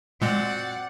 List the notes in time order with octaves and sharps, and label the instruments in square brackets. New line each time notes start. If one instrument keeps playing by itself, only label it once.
[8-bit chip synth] A#2 G#3 [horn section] C4 F#4 D5 [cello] F#5